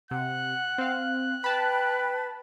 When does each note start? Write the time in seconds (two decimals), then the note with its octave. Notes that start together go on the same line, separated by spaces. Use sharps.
0.11 C3 F#5 F#6
0.78 C4 F5
1.44 B4 G5 A5 B5